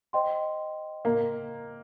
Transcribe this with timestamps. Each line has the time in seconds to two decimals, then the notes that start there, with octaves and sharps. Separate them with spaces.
0.13 C5 D#5 G5 C6
1.05 A#3